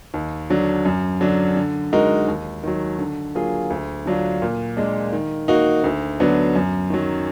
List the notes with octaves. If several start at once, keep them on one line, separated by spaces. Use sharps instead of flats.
D#2
D3 F#3 D4
F#2
D3 F#3 D4
D3
G#3 D#4 F#4 A#4
D#2
D#3 F#3
D3
F#3 A#3 F4 G#4
D2
D3 F#3 D4 F4
A#2
G#3 D4
D#3
A#3 D#4 F#4
D2
D3 F#3 B3 D4
F#2
D#3 F#3